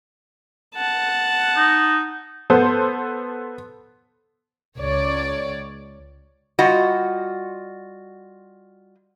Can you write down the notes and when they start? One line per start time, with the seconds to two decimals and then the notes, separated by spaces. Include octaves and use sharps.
0.75 F#5 A5
1.56 D#4
2.50 B3 A4 C5
4.78 C#2 C#5 D5
6.59 G3 F4 F#4 D#5